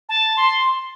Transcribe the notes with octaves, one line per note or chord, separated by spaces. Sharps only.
A5
C6